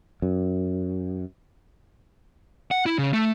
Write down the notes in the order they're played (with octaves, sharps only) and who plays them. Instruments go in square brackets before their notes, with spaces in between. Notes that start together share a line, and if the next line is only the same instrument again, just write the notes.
[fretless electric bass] F#2
[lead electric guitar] F#5
E4
C#3
A3